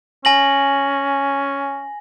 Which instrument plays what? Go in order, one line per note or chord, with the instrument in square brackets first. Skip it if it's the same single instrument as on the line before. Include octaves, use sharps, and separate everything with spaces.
[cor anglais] C#4 [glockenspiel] G#5 A#6 F#7